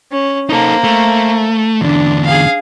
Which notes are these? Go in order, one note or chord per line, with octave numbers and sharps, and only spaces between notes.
C#4
A#3 D#4 A4 C5
A3
E2 D3 D4
G#4 F5